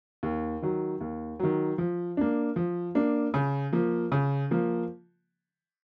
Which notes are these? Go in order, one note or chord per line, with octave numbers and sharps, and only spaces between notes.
D#2
D#3 F#3
D#2
D#3 F#3
F3
A#3 D4
F3
A#3 D4
C#3
F3 A#3
C#3
F3 A#3